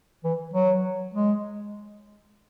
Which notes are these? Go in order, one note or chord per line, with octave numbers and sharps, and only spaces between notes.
E3
F#3
G#3